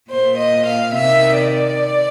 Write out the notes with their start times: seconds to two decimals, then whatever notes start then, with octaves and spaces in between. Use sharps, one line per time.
0.11 A#2 C5
0.39 D#5
0.68 F5
0.96 C3 D#3 E5
1.37 D5